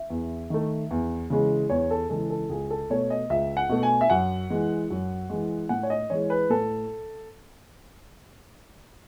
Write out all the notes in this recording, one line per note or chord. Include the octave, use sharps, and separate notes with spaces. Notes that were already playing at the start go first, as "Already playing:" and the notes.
Already playing: E5
E2
D#3 A3
E2
C#3 E3 G#3
E2 C#5
A4
C#3 E3 G#3 A4
A4
C#2 G#4
A4
B2 A3 C#5
D#5
C#2 E5
F#5
B2 A3
G#5
E5
F#2 F#5
E3 G#3
F#2
E3 G#3
A2 F#5
C#5
D#5
E3 G#3 C#5
B4
A2 A4